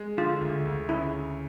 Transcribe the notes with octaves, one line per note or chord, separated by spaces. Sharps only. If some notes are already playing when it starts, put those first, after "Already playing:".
Already playing: G#3
D3 F4
D2
D2
C#3 E4